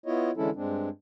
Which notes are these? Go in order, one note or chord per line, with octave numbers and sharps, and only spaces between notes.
B3 E4 F4 C#5 D#5
D3 E3 G#3 C#4 E4 A4
G2 G#3 C4 D4